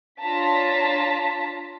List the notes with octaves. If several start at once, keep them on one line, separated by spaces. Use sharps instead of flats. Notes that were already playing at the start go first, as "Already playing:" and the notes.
D4 F4 C#5 A5 A#5 B6